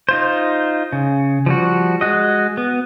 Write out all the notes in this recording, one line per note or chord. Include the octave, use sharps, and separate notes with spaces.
D#4 F4 C5
C#3
F3 G3 F#4
G#3 F#4 D#5
B3